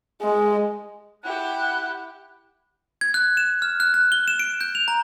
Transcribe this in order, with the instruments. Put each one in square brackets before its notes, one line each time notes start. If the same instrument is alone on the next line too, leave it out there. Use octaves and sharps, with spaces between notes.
[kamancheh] G#3
[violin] E4 G4 [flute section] F#5 F#6
[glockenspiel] G#6
F#6
E7
F6
F#6
F#6
G7
E7
D7
G6
F7
A#5